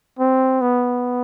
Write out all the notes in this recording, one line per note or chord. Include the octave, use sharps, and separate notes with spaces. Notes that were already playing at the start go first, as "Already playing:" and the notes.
C4
B3